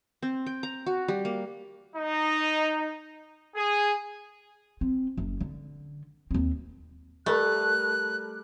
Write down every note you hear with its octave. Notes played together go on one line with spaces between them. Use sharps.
C4
G5
A#5
F#4
G3
A#3
D#4
G#4
C4
F#1
D3
D#2 C4
G3 A3 A#4 F#6